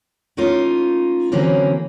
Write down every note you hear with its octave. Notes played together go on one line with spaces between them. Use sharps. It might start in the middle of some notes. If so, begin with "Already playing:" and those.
A3 A#3 C#4 D#4 F4
D3 E3 F#3 A#3 C4 C#4